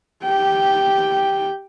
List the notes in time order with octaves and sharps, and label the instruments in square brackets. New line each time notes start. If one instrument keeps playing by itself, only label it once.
[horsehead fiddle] G4 G5